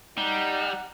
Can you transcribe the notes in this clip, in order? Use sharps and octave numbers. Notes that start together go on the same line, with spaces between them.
G3 D#4 F#5